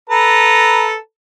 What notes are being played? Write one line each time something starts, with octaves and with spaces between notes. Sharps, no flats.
A4 B4 A#5